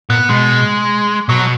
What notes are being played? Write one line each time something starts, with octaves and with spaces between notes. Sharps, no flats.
A#2 B3
B2 G#3
B2 F#3